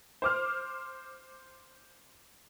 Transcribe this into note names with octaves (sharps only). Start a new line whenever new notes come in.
C5 D6 F6